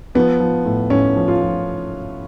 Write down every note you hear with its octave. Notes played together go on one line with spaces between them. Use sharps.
F3 B3
F3
A2
A2 C#4
F3
F4
F3